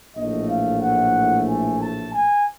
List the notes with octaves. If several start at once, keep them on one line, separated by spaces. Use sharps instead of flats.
A#1 A2 E3 A3 D#5
F5
F#5
G#5
A5
G#5